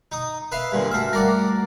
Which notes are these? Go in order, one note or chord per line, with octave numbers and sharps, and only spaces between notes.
D#4 D#6
B4 E5 F5
G2 A#2 D3
A3 F#4 E5 F6
G3 A#4 D5 F#5 D6